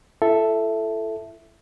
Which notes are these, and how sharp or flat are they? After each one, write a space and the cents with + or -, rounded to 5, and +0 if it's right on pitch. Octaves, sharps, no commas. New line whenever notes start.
E4 +40 A4 +0 E5 +0